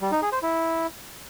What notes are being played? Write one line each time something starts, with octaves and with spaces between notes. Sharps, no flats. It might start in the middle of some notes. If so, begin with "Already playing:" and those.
G3
D#4
G#4
C5
E4